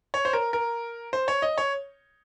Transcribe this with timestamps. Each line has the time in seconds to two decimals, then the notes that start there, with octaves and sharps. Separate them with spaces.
0.14 C#5
0.25 C5
0.33 A#4
0.53 A#4
1.13 C5
1.28 C#5
1.42 D#5
1.58 C#5